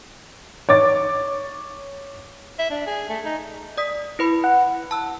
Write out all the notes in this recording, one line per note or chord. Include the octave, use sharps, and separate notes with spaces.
C#5 D6 A6
E5
D4
G#4
A3
D#4
D5 D#6 B6
E4 B4 B5
F#5
A5 E6